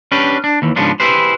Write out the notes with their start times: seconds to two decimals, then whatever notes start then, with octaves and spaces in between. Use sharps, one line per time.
0.12 C#4 D4 G4 B4
0.44 D4
0.62 D#2 E3
0.76 G#2 C#3 F3 B3 D4
1.00 E4 G4 G#4 B4 C5